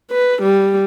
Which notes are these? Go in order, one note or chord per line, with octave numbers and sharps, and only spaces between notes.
B4
G3